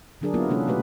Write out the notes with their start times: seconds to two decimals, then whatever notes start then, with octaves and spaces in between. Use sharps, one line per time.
0.21 D3 F#3 D4 G#4 A#4
0.34 F#3 A#3 B3 E4 F4 A#4
0.49 C3 E3 G#3 A#3 C#4 A4
0.67 B2 A3 F#4 G4 B4